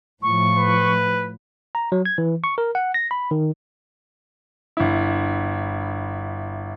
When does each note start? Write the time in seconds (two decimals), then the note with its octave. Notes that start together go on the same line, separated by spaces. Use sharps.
0.22 A2 F3 C#6
0.57 B4
1.75 A#5
1.92 F#3
2.05 G#6
2.18 E3
2.44 C#6
2.58 A#4
2.75 F#5
2.94 A#6
3.11 B5
3.31 D#3
4.77 G1 E4